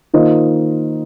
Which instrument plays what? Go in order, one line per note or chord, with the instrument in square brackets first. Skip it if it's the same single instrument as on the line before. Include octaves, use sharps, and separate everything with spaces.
[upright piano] D#3 A#3 F4 C5 D#5